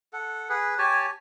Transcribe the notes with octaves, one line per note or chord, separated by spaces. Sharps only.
A4 F#5
G#4 B4
G4 C#5 G#5 A5